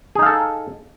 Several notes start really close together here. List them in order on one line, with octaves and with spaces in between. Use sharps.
G#4 D#4 F5 A4